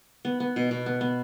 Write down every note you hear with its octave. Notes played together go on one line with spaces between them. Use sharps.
B3
B3
B2
B2
B3
B3